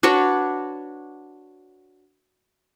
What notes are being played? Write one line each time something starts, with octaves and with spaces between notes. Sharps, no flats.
D4 F#4 B4 C#5